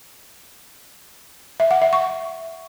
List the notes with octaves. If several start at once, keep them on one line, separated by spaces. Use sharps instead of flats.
E5
F#5
E5
C#6